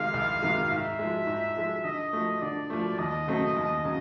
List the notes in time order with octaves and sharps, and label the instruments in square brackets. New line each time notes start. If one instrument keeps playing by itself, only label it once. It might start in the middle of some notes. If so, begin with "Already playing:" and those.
Already playing: [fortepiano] C3 D#3 G#3 [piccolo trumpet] F5
[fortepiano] C2
C3 D#3 G#3
[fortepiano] G#2 [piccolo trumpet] E5
[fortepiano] F3 G#3
G#2
F3 G#3
[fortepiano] D3 [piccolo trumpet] D#5
[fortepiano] F3 A3
[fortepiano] D3 [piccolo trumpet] D5
[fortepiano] F3 A3
[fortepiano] D#2 [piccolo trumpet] D#5
[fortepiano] C#3 F#3 A3 C4
D#2
C#3 F#3